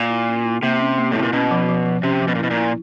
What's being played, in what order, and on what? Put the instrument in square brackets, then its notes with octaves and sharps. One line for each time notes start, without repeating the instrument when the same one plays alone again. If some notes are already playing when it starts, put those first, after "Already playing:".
Already playing: [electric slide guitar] A#2
[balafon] E4
C#4
E4
[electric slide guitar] C3 [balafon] A#3
[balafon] C#4
A#3
[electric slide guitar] A2 [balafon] E4
[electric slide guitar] A#2
[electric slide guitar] B2 [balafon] C#4
[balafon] F3
F3
F3
[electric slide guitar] C3 [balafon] C#4
[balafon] F3
[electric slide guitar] B2
A#2
[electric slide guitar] B2 [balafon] E4
[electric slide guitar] A#2
[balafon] E4